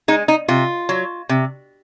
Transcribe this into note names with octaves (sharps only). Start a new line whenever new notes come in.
G#3 D#4
D#4
C3 F4
F#3
C3